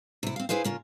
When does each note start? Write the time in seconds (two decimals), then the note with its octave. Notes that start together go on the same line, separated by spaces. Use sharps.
0.23 C3 E4
0.36 C4 F5
0.49 E4 G#4 B4 C5 F5
0.64 C#3 A#3 F4